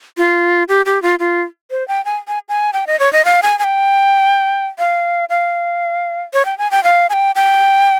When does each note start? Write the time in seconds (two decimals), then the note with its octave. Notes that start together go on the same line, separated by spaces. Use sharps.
0.17 F4
0.69 G4
0.86 G4
1.02 F4
1.19 F4
1.71 C5
1.88 G5
2.05 G#5
2.28 G#5
2.49 G#5
2.73 G5
2.87 D#5
3.00 C#5
3.13 D#5
3.25 F5
3.43 G#5
3.59 G#5
3.64 G5
4.79 F5
5.30 F5
6.34 C#5
6.45 G5
6.58 G#5
6.71 G5
6.84 F5
7.10 G#5
7.13 G5
7.36 G5